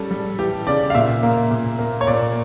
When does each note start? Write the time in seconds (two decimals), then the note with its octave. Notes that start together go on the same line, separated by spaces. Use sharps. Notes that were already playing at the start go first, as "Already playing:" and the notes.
Already playing: G3 C#4 A4
0.11 G3
0.39 E3 G4
0.67 C#3 D5
0.90 F5
0.95 A#2 E5
1.23 A#3
1.51 A#2
1.79 A#3
2.01 C#5
2.07 A#2 D5